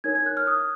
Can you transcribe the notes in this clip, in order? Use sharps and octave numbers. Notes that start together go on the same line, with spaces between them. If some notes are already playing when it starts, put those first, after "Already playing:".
D#4 A#4 C#5 G#6
G#6
F#6
F6
D#6